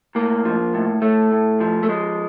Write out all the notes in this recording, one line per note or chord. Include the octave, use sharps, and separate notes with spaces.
A2 A#3
F3
A2
A2 A3
A2
F3
A3
F3 G#3